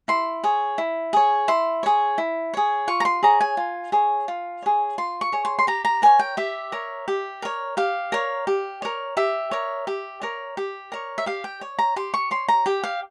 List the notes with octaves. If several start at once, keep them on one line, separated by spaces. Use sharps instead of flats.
E4 C6
G#4 C#5
E4
G#4 C#5
E4 C6
G#4 C#5
E4
G#4 C#5
F4 C#6
A#5
C6
G#4 C#5 A#5
G#5
F4
G#4 C#5
F4
G#4 C#5
F4 C6
C#6
G#4 C#5
C6
C6
G4 A#5
A#5
A#4 C#5 G#5
G5
G4 E5
A#4 C#5
G4
A#4 C#5
G4 F5
A#4 C#5
G4
A#4 C#5
G4 E5
A#4 C#5
G4
A#4 C#5
G4
A#4 C#5
E5
G4 F5
G5
C#5
A#5
G4 C6
C#6
C#5 C6
A#5
G4 G5
F5